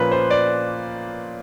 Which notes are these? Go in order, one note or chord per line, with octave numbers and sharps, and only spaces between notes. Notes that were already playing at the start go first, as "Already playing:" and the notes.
Already playing: A#2 F3 A#3 C#4 B4
C5
D5